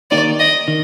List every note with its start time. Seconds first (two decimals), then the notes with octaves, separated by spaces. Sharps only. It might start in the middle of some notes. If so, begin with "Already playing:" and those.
0.11 D#3 A#3 D#4 G4 D5
0.39 D#5
0.68 D#3